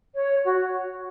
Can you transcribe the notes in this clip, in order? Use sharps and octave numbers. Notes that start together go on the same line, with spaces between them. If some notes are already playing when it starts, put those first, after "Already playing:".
C#5
F#4